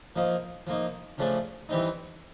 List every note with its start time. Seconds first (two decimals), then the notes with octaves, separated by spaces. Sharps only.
0.16 F3 A#3 D#4
0.67 F3 A#3 D#4
1.18 C#3 F3 A3 D4
1.69 E3 G3 C4 D#4